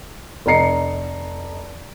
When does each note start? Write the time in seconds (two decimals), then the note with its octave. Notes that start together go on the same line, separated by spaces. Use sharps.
0.46 F1 D#5 A#5 C7 C#7